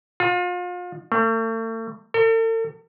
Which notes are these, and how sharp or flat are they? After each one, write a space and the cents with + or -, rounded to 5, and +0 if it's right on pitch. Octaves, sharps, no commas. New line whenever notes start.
F4 +35
A3 +40
A4 +45